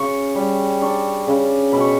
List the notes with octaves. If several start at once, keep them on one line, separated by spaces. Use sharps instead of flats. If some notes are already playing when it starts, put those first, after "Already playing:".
Already playing: C#3 C#6
G3
D4 C#6
C#3
B2 B5
C#6